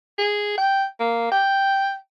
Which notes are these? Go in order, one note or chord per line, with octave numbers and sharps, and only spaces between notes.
G#4
G5
A#3
G5